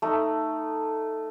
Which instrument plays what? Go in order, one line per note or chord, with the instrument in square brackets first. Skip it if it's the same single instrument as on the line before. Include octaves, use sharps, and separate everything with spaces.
[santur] A3 D#4